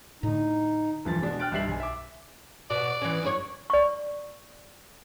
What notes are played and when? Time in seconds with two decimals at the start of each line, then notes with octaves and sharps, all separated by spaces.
0.23 A2 D3 D#4
1.05 E1 G2 E3 F3 A6
1.22 B2 G#3 D4 F#4
1.40 G5 F6 F#6 A6 D7
1.51 B1 G2 G3 E5 C7 F#7
1.67 B1 G#5
1.80 E5 D6
2.70 B2 D5
3.02 E3 C#4
3.23 F#2 E4 C#5
3.70 D5 C#6